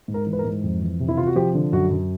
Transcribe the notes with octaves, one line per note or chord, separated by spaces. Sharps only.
G#2
A#4
E3
B4
A#4
G#2
F2
E3
C3
E4
C3 F4
F#4
F3 G4
D3
F#2 F#4
F#2